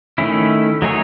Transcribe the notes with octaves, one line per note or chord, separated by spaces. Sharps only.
D#3 A3 C#4 E4
F#3 A3 D#4 G#4 C#5